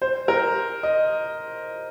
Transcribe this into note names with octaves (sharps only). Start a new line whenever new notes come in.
C5
A#4
D#5